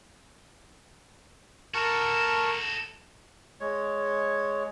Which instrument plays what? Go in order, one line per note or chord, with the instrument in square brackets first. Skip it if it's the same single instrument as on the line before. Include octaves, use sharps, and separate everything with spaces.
[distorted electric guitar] F#4 A4 [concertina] A#4 A5 C#6
[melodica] G#3 C#5